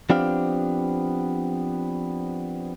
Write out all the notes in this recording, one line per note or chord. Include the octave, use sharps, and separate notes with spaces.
F3 B3 C4 D4 G4 F5